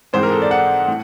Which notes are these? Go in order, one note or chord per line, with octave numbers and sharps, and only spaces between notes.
G#2 E3 G#3 C4 C5
A#4
A4
D5
F#5
A2